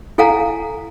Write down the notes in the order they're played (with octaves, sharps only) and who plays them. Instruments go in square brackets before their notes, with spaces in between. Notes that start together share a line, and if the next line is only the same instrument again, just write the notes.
[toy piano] E4 A4 F5 F#5 G#5 A#5